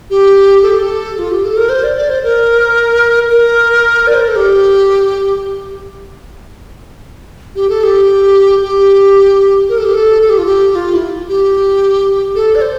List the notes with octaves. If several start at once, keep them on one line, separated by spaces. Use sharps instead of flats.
G4
A4
G4
A4
F4
G4
A4
A#4
C5
D5
D5
C5
A#4
A#4
D5
C5
A#4
A4
G4
G4
A4
G4
G4
A#4
A4
G4
A4
A4
G4
F4
G4
F4
E4
G4
A4
D5
C5